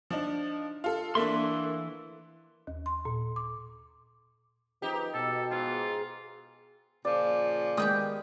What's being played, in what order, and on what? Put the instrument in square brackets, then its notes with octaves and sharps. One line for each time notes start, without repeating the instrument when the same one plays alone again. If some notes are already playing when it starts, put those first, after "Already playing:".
[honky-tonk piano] F3 D4 D#4
F4 A4
[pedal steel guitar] E3 E5 C6 [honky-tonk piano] A3 A#3 D4
[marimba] D#2
C6
A#2
D6
[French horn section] F3 B4 [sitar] D#4 G4
[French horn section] B2 [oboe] A4
[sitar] G#2 [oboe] F4
[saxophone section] A#2 C#3 F3 [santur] D5
[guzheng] D#3 B3 G4 [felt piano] G#3 D#6